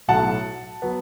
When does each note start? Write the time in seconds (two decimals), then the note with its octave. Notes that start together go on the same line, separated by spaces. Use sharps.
0.08 B1 A2 F#3 F#5 A5
0.82 F#3 B3